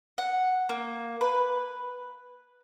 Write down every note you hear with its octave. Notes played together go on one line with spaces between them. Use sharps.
F#5
A#3
B4